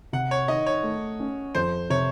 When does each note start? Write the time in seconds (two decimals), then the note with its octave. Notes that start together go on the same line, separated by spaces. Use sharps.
0.13 C3 F#5
0.31 C#5
0.48 D#3 D#5
0.66 C#5
0.83 A3
1.20 C#4
1.55 F2 C5
1.90 C3 C#5